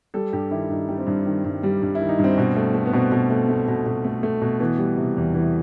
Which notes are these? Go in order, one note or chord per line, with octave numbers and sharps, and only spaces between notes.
G3 A4
G2 G4
D#3 E4
G2 D#4
G3
C4
G2
D#3
G2
G3
G2
E4
D#3
D#4
G2
C4
B2
A3
A3
B3
B2 C4
B2
A3
A3
B2
B2
A3
A3
B2
E3 B3
G3
C3
E2
E3